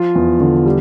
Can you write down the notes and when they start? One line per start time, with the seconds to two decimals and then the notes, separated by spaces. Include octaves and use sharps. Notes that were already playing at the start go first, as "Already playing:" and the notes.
Already playing: F3 F4
0.15 E2
0.40 D3
0.65 G3